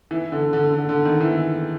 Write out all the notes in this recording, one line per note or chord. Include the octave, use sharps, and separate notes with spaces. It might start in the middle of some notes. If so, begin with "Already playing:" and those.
E3
D3
D3
D3
D3
D#3
E3